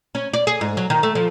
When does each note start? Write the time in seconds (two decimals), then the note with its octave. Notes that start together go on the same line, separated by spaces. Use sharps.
0.15 C#4
0.34 D5
0.47 G#4
0.61 G#2
0.77 F#3
0.90 D#3
1.03 A3
1.15 F3